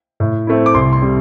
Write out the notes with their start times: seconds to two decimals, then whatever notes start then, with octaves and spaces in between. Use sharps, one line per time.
0.20 A2
0.47 A3 C4 E4
0.66 D6
0.74 C2 C6
0.93 C6
1.02 C3 G3